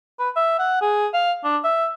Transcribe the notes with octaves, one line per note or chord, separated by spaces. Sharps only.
B4
E5
F#5
G#4
F5
D4
E5